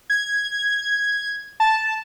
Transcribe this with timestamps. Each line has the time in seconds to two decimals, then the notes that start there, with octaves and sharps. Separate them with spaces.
0.10 G#6
1.60 A5